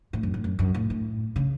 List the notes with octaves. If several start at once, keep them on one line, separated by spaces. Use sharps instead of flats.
A2
F#2
A2
F#2
F#2
A2
A2
C#3